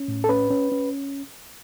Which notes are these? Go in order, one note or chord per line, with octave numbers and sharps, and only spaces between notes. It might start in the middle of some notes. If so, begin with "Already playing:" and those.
Already playing: C#4
A2
A4
C#4 B4
C#4
C#4